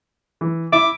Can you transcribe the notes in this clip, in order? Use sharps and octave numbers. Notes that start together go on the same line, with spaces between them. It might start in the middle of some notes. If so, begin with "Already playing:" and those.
E3
E4 E5 D6